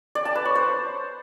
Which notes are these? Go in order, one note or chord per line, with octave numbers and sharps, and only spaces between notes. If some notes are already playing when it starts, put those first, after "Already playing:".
D5
A5
B4
C#5
C5